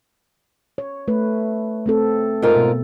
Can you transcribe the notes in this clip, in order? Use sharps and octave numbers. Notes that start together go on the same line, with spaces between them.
C#5
A3 B4
A3 C4 A4
G#2 F4 A#4
B2